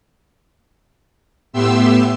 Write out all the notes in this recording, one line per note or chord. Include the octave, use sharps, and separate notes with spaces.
A2 B3 G4 E5 C6 E6